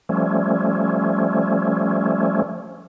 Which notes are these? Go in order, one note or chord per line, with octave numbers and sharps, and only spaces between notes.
F3 G3 A3 C#4